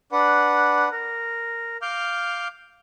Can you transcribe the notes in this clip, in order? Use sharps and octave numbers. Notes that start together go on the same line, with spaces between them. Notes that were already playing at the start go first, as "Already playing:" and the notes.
D4 B4 F#5
A#4
F5 D6 F6 G6